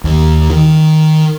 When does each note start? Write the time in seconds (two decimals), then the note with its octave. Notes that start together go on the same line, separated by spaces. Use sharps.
0.04 D#2
0.50 D#3